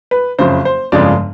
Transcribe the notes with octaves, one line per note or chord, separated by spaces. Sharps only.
B4
F#1 F2 C#3 C5
C5
G1 F2 C#3 F3 G#3 D5